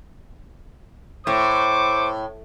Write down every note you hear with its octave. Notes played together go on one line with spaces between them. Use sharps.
A2 C5 C#6 D6